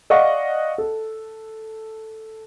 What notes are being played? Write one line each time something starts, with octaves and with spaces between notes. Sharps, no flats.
D5 D#5 F5 F#5 C#6
A4